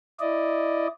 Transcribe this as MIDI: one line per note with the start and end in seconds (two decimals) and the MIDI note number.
0.20 0.87 64
0.20 0.87 74
0.20 0.87 75